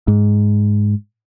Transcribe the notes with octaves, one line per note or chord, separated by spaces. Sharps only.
G#2